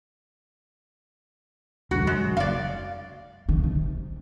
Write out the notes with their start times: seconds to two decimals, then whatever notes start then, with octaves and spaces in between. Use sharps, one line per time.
1.91 E1 D2 G2 F#4
2.07 F#2 G#3
2.37 F#1 D5 F5
3.49 D#3
3.64 C3